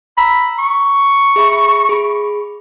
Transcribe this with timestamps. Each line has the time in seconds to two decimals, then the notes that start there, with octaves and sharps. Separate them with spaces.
0.18 A#5 B5 E6
0.59 C#6
1.36 G#4 E5 B5
1.89 G#4 B5